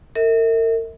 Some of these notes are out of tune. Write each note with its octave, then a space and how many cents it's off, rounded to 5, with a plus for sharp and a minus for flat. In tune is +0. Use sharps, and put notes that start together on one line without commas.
A#4 -40 E5 -40